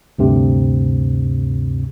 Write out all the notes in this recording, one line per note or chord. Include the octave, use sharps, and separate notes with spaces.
D2 G2 C3